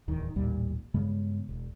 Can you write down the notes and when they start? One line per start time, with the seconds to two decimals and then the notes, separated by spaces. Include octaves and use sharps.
0.08 D1 E2 D#3
0.36 A1 D#2 A#2 G3
0.94 G2 C#3 G#3 B3
1.49 E1